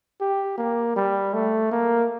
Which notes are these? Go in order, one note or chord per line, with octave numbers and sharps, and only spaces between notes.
G4
A#3
G3
A3
A#3